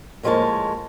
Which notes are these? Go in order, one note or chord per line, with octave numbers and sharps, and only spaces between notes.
A2 F3 G#3 A#3 C#5 A5